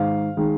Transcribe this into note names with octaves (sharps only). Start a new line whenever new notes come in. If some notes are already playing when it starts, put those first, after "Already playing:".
Already playing: G#2 D#3 F5
D#3 G#3